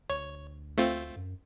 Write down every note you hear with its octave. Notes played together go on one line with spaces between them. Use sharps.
D2 C#5
A3 C4 F4
F#2